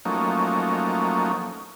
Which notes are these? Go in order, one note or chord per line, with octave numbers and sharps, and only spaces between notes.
F3 F#3 A3 A#3 C#4 D#4